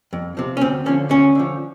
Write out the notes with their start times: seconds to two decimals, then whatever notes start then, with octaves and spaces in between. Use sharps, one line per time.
0.13 F2
0.37 C3 F3
0.57 C#4
0.61 D2 C4
0.86 D3 F3 C#4
1.10 D2 C#4
1.35 D3 F3